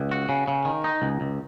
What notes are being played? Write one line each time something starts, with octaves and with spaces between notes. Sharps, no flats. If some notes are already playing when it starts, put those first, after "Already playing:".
Already playing: C#2
F#4
C#3
C#3
D#3
D#4
C#2
C#2